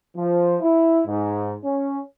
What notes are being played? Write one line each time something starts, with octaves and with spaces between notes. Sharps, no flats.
F3
E4
G#2
C#4